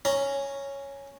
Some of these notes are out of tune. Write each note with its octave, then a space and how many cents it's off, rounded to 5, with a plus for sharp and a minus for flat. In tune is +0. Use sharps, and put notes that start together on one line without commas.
C#4 +0 A#5 +0